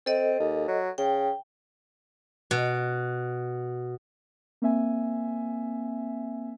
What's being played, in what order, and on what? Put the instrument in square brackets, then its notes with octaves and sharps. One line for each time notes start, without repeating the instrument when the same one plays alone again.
[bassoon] C4 [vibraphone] A4 D#5
[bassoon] D#2
F#3
[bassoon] C#3 [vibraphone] G5
[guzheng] B2
[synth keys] A#3 C4 E5 G#5